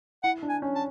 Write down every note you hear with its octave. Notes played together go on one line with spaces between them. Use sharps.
E4 F#5
D4
G#5
C#4
A5